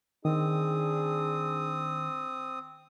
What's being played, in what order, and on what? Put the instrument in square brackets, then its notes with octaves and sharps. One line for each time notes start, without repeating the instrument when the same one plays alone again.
[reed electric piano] D#3 [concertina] C4 D#6 [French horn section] D4 G#4